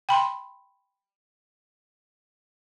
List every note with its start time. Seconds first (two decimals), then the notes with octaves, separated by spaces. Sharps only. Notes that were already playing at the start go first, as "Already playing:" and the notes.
0.09 G5 B5 C6